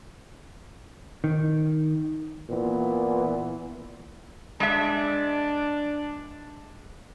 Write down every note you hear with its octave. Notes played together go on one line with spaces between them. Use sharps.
D#3
A#2 E3 B3
G#3 D4 E5